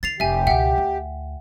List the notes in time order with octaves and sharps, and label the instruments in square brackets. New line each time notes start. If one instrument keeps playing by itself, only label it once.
[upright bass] D#3 [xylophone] A6 C7 F7
[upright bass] F1 [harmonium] G4 [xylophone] E5 G#5
[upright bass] C#2 B2 [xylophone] E5 F#5 G5
[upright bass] D2